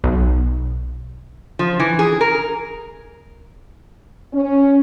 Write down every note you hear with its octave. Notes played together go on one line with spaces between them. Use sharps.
B1
F3
E3
G#4
A#4
C#4